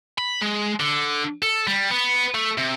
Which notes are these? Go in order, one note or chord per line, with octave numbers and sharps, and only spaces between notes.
B5
G#3
D3
A4
G3
B3
A3
C3